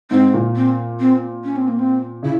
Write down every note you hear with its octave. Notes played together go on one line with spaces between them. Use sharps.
G#2 C4
A#2
C4
C4
C#4
C4
A#3
C4
C#3 E4